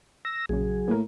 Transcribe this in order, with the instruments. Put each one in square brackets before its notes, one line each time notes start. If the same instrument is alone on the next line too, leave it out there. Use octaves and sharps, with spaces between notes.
[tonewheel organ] E6 A#6
[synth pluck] A#1 C#3 [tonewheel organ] F#3 G#4
[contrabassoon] A2 [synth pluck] A#3 A#4